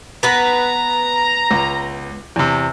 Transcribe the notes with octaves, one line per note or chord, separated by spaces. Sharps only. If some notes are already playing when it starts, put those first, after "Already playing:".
B3 B4 A#5
C#2
E2 C3